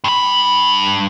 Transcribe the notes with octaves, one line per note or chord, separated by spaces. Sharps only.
G2 B5